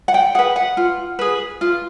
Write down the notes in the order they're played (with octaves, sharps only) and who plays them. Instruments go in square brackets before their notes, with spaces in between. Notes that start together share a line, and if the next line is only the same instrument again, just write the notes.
[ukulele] F#5
G5
G#4 F#5
B4
F#5
F4
G#4 B4
F4